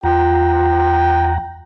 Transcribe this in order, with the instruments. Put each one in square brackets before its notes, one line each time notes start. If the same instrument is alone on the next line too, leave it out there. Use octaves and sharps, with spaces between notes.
[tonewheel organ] E2 F#5 A#5 [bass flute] F4 [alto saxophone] G5